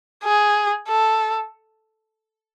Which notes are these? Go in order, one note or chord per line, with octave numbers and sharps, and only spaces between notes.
G#4
A4